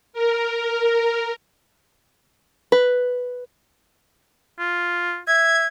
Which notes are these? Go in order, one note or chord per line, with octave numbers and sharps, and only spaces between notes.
A#4
B4
F4
E5 G#6